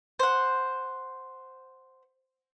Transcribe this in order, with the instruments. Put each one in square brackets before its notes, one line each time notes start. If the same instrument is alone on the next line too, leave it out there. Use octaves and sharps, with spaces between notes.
[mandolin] C5 F#5